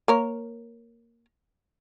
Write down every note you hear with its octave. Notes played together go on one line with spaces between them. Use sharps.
A#3 A#4 C#5